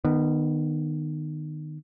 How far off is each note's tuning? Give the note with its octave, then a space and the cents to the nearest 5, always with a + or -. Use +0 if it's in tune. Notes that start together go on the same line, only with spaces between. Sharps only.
D#3 -25 B3 +0